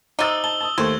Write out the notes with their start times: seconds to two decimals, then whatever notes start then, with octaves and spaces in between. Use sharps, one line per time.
0.19 C3 D#4 D6 E6 A6 G7
0.44 A5 G7
0.61 A5 D#6
0.78 D#2 A3 C5 G#6